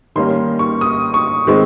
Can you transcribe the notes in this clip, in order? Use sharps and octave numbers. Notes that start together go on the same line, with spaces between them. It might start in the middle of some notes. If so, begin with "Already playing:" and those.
D#3 G3 A#3 C#4 C6
C#6
D#6
C#6
D#3 G#3 C4